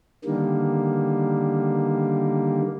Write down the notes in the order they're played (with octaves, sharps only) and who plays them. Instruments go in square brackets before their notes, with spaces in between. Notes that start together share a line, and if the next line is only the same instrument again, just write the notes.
[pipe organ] D3 D#3 G3 A#3